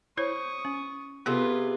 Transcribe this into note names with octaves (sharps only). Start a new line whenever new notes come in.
E4 C5 C#5 C#6 D#6
C#4
C3 B3 F4 G#4 A4 B4